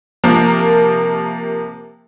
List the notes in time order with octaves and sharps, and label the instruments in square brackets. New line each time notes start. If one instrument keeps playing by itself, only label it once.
[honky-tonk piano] C3 F3 A#3 A#4